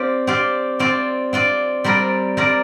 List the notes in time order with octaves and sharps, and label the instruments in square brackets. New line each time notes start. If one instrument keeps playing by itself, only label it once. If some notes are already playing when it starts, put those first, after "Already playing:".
Already playing: [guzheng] C4 G4 D5 F5
C4 G4 D5 F5
C4 F4 D5
C4 F4 D5
G3 C4 A#4 D5
G3 C4 A#4 D5